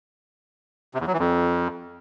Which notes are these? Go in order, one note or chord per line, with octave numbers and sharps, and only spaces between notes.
C3
E2
F#3
E3
F2